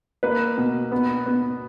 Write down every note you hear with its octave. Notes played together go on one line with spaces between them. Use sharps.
A#3 B4
B2
B3
B3